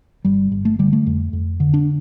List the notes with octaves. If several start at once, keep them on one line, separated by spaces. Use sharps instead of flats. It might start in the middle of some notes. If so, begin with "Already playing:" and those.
G1 G3
G1
A3
D3 G3
A3
F2
F2
D3
D4